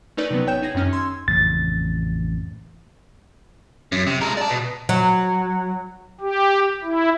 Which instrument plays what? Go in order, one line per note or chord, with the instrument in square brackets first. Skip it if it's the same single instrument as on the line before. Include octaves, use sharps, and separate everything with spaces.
[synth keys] A3 C#4 D#4 A#4 B4 D5
C3 F#3 B3
G#1 B3 C#5 G5 G6 E7
D#4 G#4 G#6 A#6
F#2 D#3 C#4 F6
C6 E6 G#6
[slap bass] A1 F2 C#3 [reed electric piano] A6
[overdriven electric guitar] F#2
C3
G#3 A#4
D5 A5
B2
[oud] F#3
[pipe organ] G4
E4